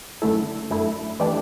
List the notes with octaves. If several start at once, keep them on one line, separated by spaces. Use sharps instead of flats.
F#2 D3 A3 E4 A4
F#2 D3 A3 E4 A4
E3 A3 D4 G4 D5